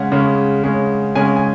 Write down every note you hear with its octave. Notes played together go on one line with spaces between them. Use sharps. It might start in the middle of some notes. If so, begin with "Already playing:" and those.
Already playing: C#3 G#3 C#4 F#5
C#3 G#3 C#4
C#3 G#3 C#4
C#3 G#3 C#4 G#5
G#5